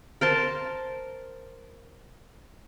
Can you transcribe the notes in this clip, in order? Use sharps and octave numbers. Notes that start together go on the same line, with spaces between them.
A#4 C5 A5